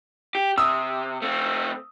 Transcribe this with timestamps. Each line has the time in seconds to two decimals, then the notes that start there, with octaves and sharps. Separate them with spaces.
0.35 G4
0.58 C3 D#6 E6
1.22 A3 C4